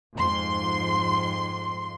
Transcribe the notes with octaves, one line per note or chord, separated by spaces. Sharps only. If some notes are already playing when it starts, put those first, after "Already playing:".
F2 G#2 C6